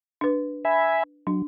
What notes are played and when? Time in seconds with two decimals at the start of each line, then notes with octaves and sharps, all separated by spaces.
0.21 D4 B4
0.65 E5 G#5 B5
1.27 F#3 D4